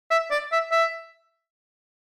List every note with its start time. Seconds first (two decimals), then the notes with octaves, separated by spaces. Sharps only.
0.11 E5
0.31 D5
0.52 E5
0.71 E5